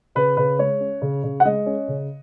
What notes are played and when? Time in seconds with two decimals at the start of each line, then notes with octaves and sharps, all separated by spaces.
0.15 C#3 B4
0.37 C#3 B4
0.59 G#3 C#5
0.80 C#4
1.02 C#3
1.24 C#3
1.40 F#5
1.45 G#3 D#5
1.66 C#4
1.88 C#3